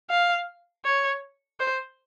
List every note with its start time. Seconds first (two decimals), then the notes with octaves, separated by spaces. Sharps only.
0.10 F5
0.85 C#5
1.59 C5